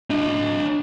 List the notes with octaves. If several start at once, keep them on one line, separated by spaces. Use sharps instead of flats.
D4 D#5